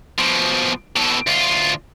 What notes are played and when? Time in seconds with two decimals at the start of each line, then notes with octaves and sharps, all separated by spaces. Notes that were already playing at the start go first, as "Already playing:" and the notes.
0.19 B2 F3
0.96 B2 A4
1.27 D2 F4